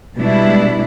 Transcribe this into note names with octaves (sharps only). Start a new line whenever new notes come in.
B2 G3 G#3 D4 E4